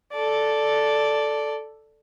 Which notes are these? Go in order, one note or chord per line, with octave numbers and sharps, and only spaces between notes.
A4 D5